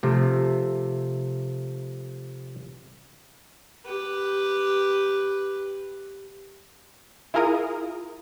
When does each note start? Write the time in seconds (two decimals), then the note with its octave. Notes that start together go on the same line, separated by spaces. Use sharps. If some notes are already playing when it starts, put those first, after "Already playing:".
0.03 C3 F3 A3
3.85 G4 B4
7.34 E4 F4 G#4 A#4 A#5 D#6